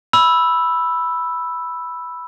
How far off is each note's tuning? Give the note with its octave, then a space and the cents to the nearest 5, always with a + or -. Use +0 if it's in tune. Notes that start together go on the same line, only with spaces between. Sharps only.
B5 +0 E6 +0